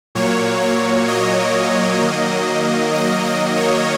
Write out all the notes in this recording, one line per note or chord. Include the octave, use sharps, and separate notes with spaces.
A#2 F#3 A#3 C#5
C#5
D#5
D#3 F#3 A#3
D#5
D#5
C#5